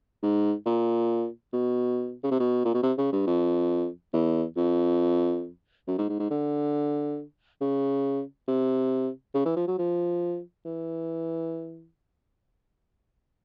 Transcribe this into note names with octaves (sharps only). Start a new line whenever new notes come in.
G#2
A#2
B2
C#3
C3
B2
A#2
B2
C3
C#3
G2
F2
E2
F2
F#2
G#2
G#2
G#2
D3
C#3
C3
C#3
E3
F3
F#3
F3
E3